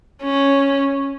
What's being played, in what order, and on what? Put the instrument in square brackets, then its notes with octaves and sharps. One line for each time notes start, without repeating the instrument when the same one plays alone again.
[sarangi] C#4